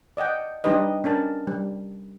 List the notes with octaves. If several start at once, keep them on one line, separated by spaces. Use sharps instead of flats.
D5 D#5 F#5 G5
G3 D4 D#4 G4 B4 D#5
C#4 D4 A#4 A5
G3